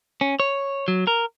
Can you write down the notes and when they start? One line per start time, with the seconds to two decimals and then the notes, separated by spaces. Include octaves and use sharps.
0.21 C#4
0.40 C#5
0.88 F#3
1.07 A#4